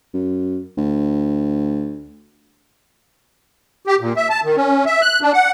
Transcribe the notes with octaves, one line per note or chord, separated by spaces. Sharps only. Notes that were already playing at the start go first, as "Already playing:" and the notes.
F#2
D2
G4
A#2
E5
A5
D#3
C#4
E5
F#6
D4
F#5